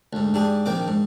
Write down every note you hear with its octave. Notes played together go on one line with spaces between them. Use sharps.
D2 G#2
G#2 D4 G4 G#4
A#1 D#3 C4 G5 D6
G#2